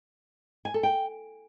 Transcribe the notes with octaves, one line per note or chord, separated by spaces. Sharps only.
G#5
A4
G5